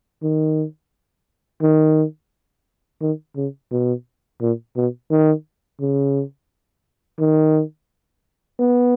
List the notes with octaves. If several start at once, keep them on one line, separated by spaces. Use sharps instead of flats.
D#3
D#3
D#3
C#3
B2
A#2
B2
D#3
C#3
D#3
B3